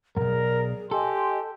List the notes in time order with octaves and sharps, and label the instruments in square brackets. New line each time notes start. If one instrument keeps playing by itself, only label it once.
[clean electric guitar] B1 F#2 [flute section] G#4 D5 [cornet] A#4
[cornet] G4 [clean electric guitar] A4 [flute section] D#5 G#5 C6